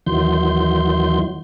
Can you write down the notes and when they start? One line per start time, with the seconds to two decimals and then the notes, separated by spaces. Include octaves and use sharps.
0.06 D#2 D#3 E3 F#3 C6 G6